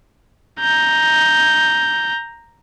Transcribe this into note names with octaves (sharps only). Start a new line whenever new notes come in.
A#5 G6